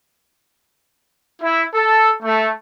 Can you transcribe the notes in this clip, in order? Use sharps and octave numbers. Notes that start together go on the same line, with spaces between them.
E4
A4
A3